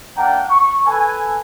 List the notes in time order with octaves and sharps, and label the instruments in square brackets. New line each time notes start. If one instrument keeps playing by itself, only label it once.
[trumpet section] A#3 D4 F#5 G5 A#5
C#6
A4 B4 G#5